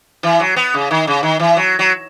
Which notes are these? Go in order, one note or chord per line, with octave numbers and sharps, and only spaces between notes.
E3
F#3
B3
C#3
D#3
C#3
D#3
E3
F#3
F#3